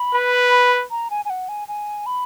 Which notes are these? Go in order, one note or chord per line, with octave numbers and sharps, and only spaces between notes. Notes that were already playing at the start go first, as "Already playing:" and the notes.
Already playing: B5
B4
A#5
G#5
G#5
F#5
G#5
G#5
B5